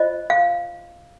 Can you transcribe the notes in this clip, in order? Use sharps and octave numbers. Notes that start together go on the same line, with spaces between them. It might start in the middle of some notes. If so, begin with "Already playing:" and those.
Already playing: F4 C5 D#5
F5